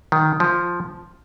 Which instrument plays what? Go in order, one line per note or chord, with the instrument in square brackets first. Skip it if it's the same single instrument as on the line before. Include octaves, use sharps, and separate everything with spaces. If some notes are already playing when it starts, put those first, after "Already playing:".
[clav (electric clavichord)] D#3
F3